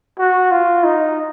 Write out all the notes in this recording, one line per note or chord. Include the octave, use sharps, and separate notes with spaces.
F#4
F4
D#4